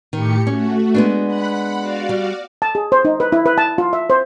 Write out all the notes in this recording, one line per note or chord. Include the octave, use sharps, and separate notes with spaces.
A2 D#3 G4 C#7
A3 C#4 F#4
G#3 B3 D4
F#5 B5 F#6
F#4 D5 F5
G3
A5
G#4
C5
D#4
B4
E4
B4
A5
F4
E5
C5